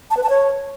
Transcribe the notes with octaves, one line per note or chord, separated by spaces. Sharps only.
A5
B4
A5
C#5